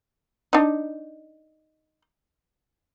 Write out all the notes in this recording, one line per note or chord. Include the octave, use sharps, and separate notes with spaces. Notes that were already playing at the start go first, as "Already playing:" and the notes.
D4 D#4